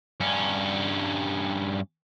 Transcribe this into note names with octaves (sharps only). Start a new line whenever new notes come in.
G2 C#4